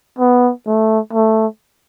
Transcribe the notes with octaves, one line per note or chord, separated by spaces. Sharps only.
B3
A3
A3